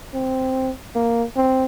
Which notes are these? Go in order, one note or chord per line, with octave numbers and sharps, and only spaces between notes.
C4
A#3
C4